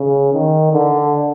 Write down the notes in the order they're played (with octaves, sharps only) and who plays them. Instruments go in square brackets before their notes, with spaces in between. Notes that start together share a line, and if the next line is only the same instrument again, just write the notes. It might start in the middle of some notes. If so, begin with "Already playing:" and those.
Already playing: [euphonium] C#3
D#3
D3